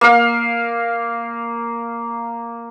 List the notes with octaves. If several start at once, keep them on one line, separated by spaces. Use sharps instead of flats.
A#3 F5